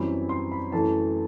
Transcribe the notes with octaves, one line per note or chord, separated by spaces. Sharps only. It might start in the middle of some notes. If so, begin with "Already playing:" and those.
Already playing: F#2 E3 G3 C4 B5
C6
B5
F#2 E3 A3 A5